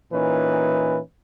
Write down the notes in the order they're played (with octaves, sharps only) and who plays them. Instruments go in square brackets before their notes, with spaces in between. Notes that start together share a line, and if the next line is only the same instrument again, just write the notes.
[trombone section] A#2 E3 C#4 D#4 B4